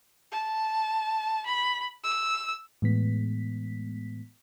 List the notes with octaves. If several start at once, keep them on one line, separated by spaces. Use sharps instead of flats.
A5
B5
E6
A2 E3 G#3 B3 B6